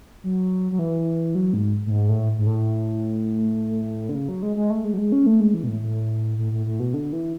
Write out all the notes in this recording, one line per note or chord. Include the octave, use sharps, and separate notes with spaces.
F#3
F#3
E3
F#3
G#2
A2
G#2
A2
G#2
A2
D3
C#3
F#3
G#3
G#3
A3
G#3
F#3
G#3
C#4
A3
G#3
E3
B2
A2
A2
A2
A2
A2
B2
D3
E3